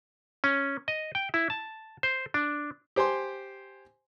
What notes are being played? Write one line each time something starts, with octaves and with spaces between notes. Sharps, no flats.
C#4
D#5
G5
E4
A5
C5
D4
G4 C5 G#5 C6